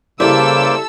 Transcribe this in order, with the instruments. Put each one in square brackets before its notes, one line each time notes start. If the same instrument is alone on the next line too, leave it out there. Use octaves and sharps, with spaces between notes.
[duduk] C#3 [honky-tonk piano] G3 E4 [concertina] A#3 C5 D6 [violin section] A4 E6